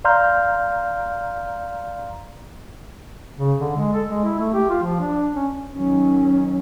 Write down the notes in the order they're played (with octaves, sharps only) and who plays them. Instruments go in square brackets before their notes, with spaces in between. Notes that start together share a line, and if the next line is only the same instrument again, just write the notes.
[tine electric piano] D5 F5 A#5 C6 F6 G6
[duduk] C#3
D3
G#3
A4
G#3
E4
A3
G4
F4
F3
D4
C#4
[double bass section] D#3 F#3 C#4